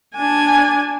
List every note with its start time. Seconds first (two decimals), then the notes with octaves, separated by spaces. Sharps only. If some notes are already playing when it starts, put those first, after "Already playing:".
0.16 D4 G#5